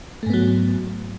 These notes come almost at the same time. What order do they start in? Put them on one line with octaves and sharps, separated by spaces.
A3 G#2 B3 F#3